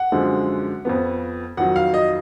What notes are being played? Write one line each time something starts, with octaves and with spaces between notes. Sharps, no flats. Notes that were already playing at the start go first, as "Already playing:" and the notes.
Already playing: F#5
F#2 D3 F3 G#3
F2 F3 B3
F2 D#3 F#3 F#5
F5
D#5